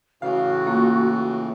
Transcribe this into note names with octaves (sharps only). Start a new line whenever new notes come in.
A2 C#3 E3 F#4 F5
A#3 F4